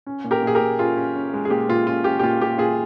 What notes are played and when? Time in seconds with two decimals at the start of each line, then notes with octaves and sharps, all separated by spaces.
0.07 C#4
0.24 A#2
0.31 G4 A#4
0.42 A#2 G#4
0.55 G4 A#4
0.61 A#2
0.79 C#4 F4 G#4
0.96 C#4
1.16 C#4
1.34 G#3
1.45 G#4
1.50 A#2 G4
1.69 A#2 F4
1.87 C#4 F4
2.04 C#4 G4
2.19 G4
2.23 A#2 F4
2.41 A#2 G4
2.58 A#2 F4 G#4